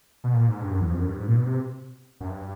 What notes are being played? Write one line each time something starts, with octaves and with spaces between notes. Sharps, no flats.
B2
A#2
G#2
G2
F#2
E2
F2
F#2
G2
G#2
A#2
B2
C3
F#2
G2